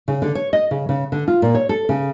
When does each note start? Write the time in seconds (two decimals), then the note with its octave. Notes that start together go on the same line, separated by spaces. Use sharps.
0.08 C#3
0.22 D3
0.35 C#5
0.53 D#5
0.71 C#3
0.89 C#3
1.12 D3
1.28 F4
1.42 A#2
1.55 C#5
1.69 A4
1.89 C#3